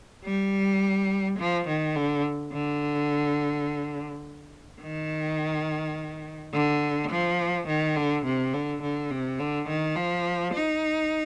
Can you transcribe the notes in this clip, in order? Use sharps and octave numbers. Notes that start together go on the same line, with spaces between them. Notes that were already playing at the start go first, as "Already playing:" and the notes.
G3
F3
D#3
D3
D3
D#3
D3
F3
D#3
D3
C3
D3
D3
C3
D3
D#3
F3
D#4